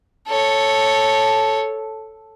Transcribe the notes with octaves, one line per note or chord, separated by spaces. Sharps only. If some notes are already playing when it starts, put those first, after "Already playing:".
A4 C#5